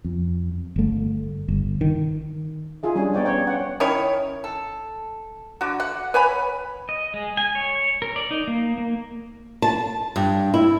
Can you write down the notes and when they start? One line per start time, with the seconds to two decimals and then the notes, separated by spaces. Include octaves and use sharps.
0.04 F2
0.76 G1 A3
1.48 G1
1.81 D#3
2.83 D#4 F4 G#4 E5
2.95 G3 C#4 D4 G#4 G#5
3.14 B3 D#4 C#5 D5 G5
3.25 C#4 C#5 F5 G5
3.47 C#4 F#5 G5
3.60 C#5
3.80 D#3 C#4 E4 C#5
4.44 A4
5.61 D3 F#4
5.80 F#5
6.14 B4 C#5 G#5 B5
6.89 D#5
7.14 G#3
7.37 G#5
7.55 C#5
8.02 A#4
8.16 D5
8.31 D#4
8.47 A#3
8.78 A#3
9.62 A5
10.16 G2
10.54 E4